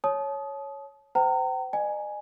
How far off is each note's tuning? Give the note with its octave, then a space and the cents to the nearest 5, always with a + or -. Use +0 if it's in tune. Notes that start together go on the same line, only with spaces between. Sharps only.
C#5 +0 A5 -35 D#6 +5
C5 -30 G5 -40 A#5 -30
D#5 -45 G#5 +0